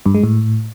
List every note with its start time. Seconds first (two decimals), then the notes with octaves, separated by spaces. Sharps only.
0.06 G2
0.15 G#3
0.24 A2